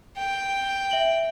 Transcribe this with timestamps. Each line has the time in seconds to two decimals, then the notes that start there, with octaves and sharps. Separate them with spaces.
0.18 G5
0.91 E5 F#7